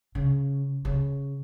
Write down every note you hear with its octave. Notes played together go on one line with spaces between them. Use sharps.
C#3
C#3